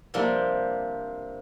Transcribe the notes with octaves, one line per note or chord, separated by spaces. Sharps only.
C3 F3 G3 A#3 D4